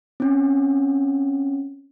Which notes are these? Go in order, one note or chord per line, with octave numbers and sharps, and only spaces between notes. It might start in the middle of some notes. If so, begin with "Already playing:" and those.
C4 C#4